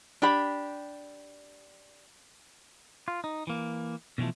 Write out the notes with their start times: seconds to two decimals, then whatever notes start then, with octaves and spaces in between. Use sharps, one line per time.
0.22 D4 G4 B5
3.08 F4
3.24 D#4
3.47 E3 A#3
4.18 B2 D3 E3 F3 A3